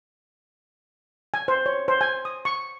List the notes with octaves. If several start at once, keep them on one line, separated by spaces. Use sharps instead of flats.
G#5
C5
C#5
C5
G#5
D#6
C#6